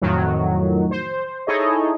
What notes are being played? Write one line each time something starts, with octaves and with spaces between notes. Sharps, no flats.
F2 A2 D#3 F#3
C5
D#4 E4 G#4 A4 C#5 D#5